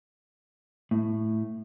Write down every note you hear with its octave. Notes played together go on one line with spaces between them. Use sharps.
A2